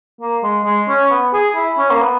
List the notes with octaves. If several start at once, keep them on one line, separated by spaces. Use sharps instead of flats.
A#3
G#3
G#3
C#4
B3
G#4
E4
C#4
A#3
B3